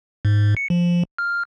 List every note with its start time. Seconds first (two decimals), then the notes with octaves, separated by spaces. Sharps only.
0.25 G#2
0.57 C#7
0.70 F3
1.18 F6